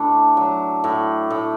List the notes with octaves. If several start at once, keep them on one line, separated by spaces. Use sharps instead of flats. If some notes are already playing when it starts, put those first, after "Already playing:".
Already playing: A2 D4
F#3
A2
A2